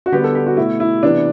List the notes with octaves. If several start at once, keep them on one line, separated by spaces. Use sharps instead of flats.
F#4
D3 G3 B3 G4
A4
G4
F#4
B2 A3 E4
E4
C3 E3 B3 D4